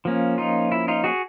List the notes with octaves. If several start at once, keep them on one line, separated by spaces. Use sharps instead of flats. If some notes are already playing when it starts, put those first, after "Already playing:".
F3 A#3 C#4
D#4 F4
E4
D#4 F4
F#4 G#4